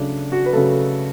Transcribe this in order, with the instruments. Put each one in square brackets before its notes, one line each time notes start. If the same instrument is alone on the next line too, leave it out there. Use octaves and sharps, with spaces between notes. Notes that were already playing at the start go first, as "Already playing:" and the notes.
Already playing: [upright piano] C#3 F#3 A3 D4
F#4
B4
C#3 F#3 A3 A4